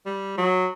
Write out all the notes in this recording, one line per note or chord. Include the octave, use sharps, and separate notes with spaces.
G3
F#3